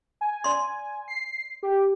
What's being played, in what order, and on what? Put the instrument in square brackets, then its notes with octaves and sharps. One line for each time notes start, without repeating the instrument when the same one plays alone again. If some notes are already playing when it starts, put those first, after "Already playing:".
[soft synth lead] G#5
[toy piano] D5 C6
[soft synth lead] C7
G4